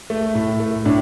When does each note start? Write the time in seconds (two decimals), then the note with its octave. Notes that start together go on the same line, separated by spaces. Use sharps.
0.10 A3
0.35 A2
0.60 A3
0.86 A2 D4